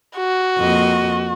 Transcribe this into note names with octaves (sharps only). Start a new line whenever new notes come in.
F#4
F2 A#3 D#5